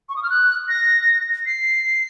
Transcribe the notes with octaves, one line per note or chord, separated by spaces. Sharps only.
C#6
D#6
F6
F#6
A#6
C7